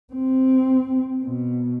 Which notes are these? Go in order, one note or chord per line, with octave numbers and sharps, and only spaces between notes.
C4
B2